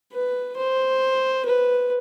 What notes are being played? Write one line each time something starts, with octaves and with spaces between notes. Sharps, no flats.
B4
C5
B4